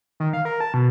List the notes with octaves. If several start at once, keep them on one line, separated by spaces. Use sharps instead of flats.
D#3
F5
A#4
A5
B2